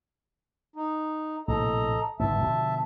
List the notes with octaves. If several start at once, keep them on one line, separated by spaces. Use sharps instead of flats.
D#4
A#1 A2 C3 A4 D#5 A#5
G1 G#2 B3 E5 A5
B2 D3 F3